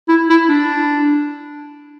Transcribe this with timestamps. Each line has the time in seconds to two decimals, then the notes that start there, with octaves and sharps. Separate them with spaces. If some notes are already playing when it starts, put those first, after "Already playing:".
0.08 E4
0.29 E4
0.49 D4